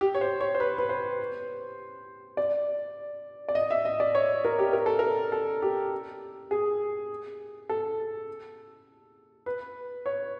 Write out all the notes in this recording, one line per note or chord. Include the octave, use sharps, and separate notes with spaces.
G4
C#5
C5
C#5
C5
B4
B4
C5
D5
D5
D#5
E5
D#5
D5
C#5
A#4
G4
A#4
A4
A#4
A4
G4
G#4
A4
B4
C#5